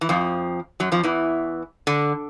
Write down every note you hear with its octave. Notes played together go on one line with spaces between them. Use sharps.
E3
F2 F3
F#2 F#3
F2 F3
E2 E3
D3